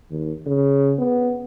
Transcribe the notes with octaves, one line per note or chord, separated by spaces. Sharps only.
D#2
C#3
B3